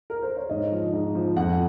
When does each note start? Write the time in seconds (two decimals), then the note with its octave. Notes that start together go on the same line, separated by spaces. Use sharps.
0.10 A#4
0.23 C5
0.37 C#5
0.50 G#2 D#5
0.72 F3
0.93 G#2
1.15 F3
1.37 F2 F#5